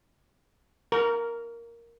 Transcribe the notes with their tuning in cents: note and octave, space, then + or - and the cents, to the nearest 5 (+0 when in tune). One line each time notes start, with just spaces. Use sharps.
A#4 +0 C#6 +45